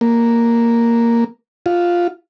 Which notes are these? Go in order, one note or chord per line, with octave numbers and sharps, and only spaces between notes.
A#3
F4